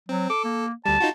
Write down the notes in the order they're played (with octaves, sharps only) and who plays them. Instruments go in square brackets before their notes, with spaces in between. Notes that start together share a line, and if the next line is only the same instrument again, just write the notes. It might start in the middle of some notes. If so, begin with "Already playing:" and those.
[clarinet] F#3 [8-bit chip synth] C4
[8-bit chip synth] A4 [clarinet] D6
[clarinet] A#3
[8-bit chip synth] D2 G3 [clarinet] A5
[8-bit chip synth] D#4 F4 F#4